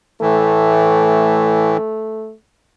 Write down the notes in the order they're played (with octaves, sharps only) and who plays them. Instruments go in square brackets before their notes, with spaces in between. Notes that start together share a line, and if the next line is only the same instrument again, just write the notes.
[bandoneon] A2 E3 [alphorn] A3